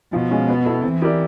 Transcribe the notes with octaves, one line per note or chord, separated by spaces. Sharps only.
B2 F3
G#3 C#4 F4
B3
E4 A4
E3 C4
E4 G4 A#4 D5